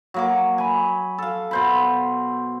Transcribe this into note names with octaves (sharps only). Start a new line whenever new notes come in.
F#3 A#3 D6
G#5 B5
A4 F5
B2 C5 B5